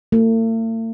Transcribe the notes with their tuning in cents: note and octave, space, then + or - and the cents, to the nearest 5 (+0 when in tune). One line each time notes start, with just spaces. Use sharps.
A3 +45